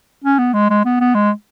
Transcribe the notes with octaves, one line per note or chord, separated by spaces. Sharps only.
C#4
B3
G#3
G#3
B3
B3
G#3